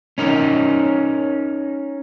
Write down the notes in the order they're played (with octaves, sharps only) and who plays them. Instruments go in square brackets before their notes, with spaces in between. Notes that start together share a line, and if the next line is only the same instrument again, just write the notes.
[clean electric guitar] C#4 D#4 A#4